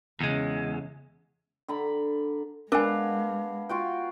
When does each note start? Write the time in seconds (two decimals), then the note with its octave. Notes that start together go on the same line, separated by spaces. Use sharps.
0.21 E2 C#3 G#3
1.68 D3 A#5 B5
2.72 G#3 B3 D4 A#4 F5 G#5
3.69 F4 F#4 G5